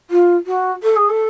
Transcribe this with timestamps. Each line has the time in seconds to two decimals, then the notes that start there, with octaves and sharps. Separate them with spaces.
0.10 F4
0.46 F#4
0.83 A4
0.96 G#4
1.09 A4